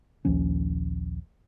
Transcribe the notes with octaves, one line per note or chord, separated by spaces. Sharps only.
A#1 D#2 F3 C#4